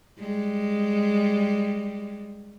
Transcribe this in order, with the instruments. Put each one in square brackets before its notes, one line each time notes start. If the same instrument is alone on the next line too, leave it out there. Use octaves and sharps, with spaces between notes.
[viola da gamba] G3 G#3